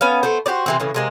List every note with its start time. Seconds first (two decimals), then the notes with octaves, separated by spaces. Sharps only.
0.01 B3 C#4 F5
0.23 A3 B3 C5
0.46 F#4 G4 C5 D5
0.66 C3 E3 C4
0.80 A2 C#3 E3
0.94 C3 G#3 A#3